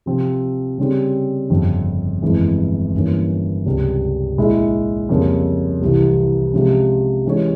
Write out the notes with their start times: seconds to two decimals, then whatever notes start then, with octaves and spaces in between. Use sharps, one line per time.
0.06 C3 F3 C4
0.78 C#3 G3 C4
1.50 G1 F2 C#3 F3 C4
2.22 G1 F2 E3 G#3
2.94 G1 G2 E3 A#3 C#4
3.66 C#2 C3 G3
4.38 A#1 A#2 G#3 E4
5.09 F2 C#3 G3 A#3
5.81 C2 C3 E3
6.53 C3 F3 G#3 C#4
7.25 E3 G#3 C#4 G4 C#5